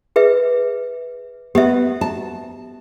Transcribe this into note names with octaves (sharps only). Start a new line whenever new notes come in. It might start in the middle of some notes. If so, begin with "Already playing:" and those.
G#4 B4 E5
B3 G4 E5
A5